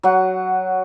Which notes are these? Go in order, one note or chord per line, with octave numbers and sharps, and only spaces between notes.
F#3 F#5